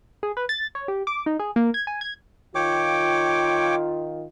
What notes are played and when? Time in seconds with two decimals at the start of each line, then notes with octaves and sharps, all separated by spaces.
0.23 G#4
0.37 B4
0.49 A6
0.75 C#5
0.88 G4
1.07 D6
1.26 D#4
1.39 G#4
1.56 A#3
1.74 G#6
1.87 G#5
2.01 G#6
2.55 D#3 F4 C#5 G5 D6